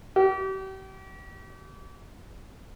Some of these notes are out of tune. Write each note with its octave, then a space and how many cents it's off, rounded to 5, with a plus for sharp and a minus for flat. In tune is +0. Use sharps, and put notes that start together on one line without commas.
G4 -40